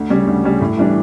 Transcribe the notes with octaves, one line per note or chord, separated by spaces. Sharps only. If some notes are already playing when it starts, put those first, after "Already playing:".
Already playing: D2
C#3 G3 C#4
D2
C#3 G3 C#4
A2
E3 G3 D4